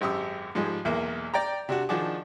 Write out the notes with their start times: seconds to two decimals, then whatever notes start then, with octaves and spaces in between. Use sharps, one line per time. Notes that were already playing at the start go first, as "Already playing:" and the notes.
0.01 G#1 F#2 G4 D#6 E6
0.55 G#2 F3 G3 G#3
0.85 B1 E2 A#3 E5
1.34 D5 G5 A#5
1.69 C3 D4 F#4
1.89 D#3 F3 D4 F#4 G#4 D6